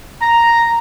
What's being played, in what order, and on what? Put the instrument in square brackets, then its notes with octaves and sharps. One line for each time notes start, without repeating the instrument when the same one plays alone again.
[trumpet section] A#5